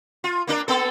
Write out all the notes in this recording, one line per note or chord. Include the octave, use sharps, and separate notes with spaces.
F4
A#3 D4 A#4
A#3 B3 A4